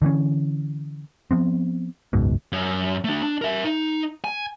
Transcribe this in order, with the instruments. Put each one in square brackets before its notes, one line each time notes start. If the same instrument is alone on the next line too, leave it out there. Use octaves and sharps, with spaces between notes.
[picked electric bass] D3 E3 C4 C#4
F3 B3 C4
F#1 C#2 G#2 B2
[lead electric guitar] F#2
A3 D4
D4
A#4 E5
D#4
G#5